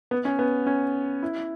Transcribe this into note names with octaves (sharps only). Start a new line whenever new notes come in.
B3
C#4
B3
C#4
E4